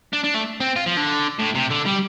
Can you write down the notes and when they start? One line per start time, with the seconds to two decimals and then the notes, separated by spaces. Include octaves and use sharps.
0.13 D4
0.24 D4
0.35 A3
0.60 C4
0.76 F4
0.87 F3
0.97 D3
1.39 A2
1.55 C3
1.70 D3
1.86 G3